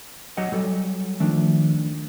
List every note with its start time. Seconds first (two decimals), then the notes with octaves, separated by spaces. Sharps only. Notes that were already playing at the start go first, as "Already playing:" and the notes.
0.37 F#3 D#5 F#5
0.52 F#3 G3 A4
1.20 D#3 F3 A3 D4